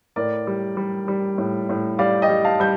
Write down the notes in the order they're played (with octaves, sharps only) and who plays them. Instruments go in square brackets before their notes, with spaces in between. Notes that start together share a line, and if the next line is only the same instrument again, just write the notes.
[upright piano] A2 A#4 D5
G3
G3
G3
A2
A2
G3 D5 F5
D#5 G5
G3
F5 A5
G3 G6